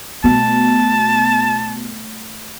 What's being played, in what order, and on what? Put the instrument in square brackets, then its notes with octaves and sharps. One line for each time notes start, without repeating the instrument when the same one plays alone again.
[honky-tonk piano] B2 [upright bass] G3 A3 [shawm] A5